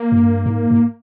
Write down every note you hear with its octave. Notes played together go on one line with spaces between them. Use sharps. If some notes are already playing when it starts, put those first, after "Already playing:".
Already playing: A#3
G2
G#2
G#2